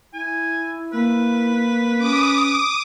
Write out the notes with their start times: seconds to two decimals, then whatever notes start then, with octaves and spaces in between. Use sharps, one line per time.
0.14 E4 G#5
0.93 A#3 B4
1.99 C#4 D6 D#6